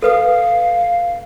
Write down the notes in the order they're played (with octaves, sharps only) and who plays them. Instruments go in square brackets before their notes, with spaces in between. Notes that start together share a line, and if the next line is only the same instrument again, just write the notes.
[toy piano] A4 B4 D#6 [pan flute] F5